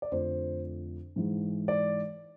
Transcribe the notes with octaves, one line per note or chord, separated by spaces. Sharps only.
D5
F2 D3 F3 A3 C5
G#2 E3 G#3
D5